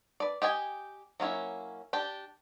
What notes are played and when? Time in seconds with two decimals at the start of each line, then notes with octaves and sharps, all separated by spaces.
0.20 B4 D5
0.42 G4 D#5 G5 G#5
1.20 F#3 A#3 C#4 E4
1.93 D4 G4 G5